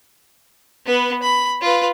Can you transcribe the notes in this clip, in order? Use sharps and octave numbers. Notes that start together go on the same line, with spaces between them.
B3 B4
B5
F4 B4